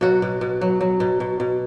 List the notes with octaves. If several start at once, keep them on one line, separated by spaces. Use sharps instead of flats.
B2 F#3 F#4
B2
B2
F#3
F#3
B2
B2
B2